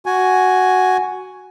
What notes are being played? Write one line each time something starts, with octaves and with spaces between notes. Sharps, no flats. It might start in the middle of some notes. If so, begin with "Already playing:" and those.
F#4 G#5